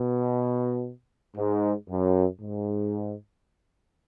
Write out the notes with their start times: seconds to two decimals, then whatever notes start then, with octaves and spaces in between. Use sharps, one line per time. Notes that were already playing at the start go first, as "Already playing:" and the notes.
Already playing: B2
1.37 G#2
1.89 F#2
2.41 G#2